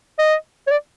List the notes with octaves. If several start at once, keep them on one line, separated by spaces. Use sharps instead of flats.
D#5
C#5
D5